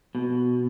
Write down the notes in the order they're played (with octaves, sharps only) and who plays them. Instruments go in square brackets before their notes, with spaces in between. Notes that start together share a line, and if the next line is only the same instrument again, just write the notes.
[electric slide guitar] B2